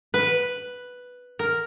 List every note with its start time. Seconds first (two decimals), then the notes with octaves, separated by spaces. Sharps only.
0.14 B4
1.39 A#4